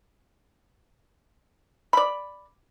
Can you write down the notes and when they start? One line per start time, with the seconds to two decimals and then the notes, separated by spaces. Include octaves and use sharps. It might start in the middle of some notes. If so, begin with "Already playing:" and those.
1.93 D5 B5